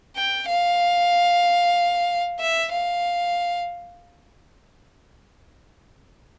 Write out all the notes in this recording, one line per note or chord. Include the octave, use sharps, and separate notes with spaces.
G5
F5
E5
F5